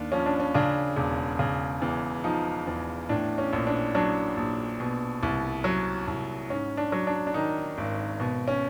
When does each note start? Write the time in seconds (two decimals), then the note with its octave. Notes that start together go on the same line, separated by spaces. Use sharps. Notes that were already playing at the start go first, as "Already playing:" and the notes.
Already playing: D#2 D4
0.12 F3 C#4
0.26 D4
0.40 C#4
0.54 C#3 D4
0.96 E1
1.39 C#3
1.82 E2
2.24 F3 D#4
2.67 E2
3.09 A2 D4
3.38 C#4
3.53 A#1
3.67 D4
3.95 F#3 D4
4.37 A#1
4.80 B2
5.23 C2
5.64 F#3
6.08 C2
6.50 G#2 C#4
6.77 D4
6.92 F#3
7.07 D4
7.27 D4
7.34 D#3 D#4
7.78 G#1
8.20 B2
8.48 C#4